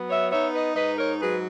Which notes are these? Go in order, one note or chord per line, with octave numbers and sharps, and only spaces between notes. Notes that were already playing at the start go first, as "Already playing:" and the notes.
Already playing: F#3 B3
C#5 E5
D#4 C#5 E5
B4 D#5
G#2 B4 D#5
A#4 C#5
F#3 G#4 B4